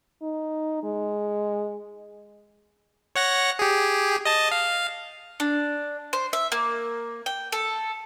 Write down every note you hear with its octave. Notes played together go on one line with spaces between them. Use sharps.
D#4
G#3
C#5 F#5 A#6
G4 G#4
D#5 A5
F5
D4
C5
E5
A#3
G5
A4